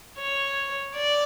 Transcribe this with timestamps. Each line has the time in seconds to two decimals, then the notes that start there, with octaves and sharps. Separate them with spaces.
0.18 C#5
0.95 D5